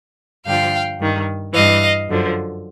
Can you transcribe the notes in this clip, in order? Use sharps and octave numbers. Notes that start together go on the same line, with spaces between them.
G2 D3 F3 F5 G5
G2 D#3
G2 E3 D#5 F5
F#2 D3 F3